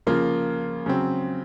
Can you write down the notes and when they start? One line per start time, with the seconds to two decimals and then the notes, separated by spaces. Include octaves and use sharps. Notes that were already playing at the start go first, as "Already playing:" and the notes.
0.07 C#3 F3 A#3 F4
0.86 C#3 F#3 C4